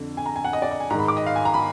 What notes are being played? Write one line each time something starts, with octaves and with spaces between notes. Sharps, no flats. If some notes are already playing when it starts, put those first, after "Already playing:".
Already playing: F2 D3
G#5
A#5
G#5
F#5
D#5
D5
D#5
G#5
G#2 D#3 A#5 B5
D6
D#5
F5
G#5
A#5
B5